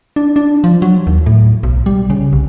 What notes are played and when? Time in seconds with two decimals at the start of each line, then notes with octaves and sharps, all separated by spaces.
0.16 D4
0.36 D4
0.64 F3
0.82 F#3
1.07 D#2
1.26 A2
1.63 B1
1.86 G3
2.10 C#3
2.33 C2